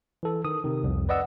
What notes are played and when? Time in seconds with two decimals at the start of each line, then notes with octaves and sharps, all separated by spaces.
0.23 E3 A4
0.45 D#3 D#6
0.64 C3 D#3
0.84 C2 F2
1.09 B4 D5 D#5 F#5 E6